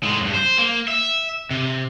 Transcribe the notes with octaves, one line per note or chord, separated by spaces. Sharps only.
A2 G#3
E2 G2
C5
A#3
E5
C3